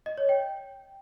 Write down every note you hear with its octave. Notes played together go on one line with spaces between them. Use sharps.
D#5
C#5
G5